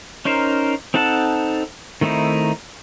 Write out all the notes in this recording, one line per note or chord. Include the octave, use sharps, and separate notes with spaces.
C#4 D#4 A#4 C5
C4 D#4 A4 F#5 A5
D#3 A3 C4 D#4 E4